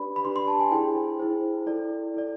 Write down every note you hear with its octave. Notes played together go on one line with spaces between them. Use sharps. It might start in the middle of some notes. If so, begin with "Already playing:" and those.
Already playing: D4 G4 B4 D5 B5
B5
D4 G4 B4 D5 C6
C6
A5
G#5
E4 G#4 C5 G5
E4 G#4 C5
E4 A4 D5
E4 A4 D5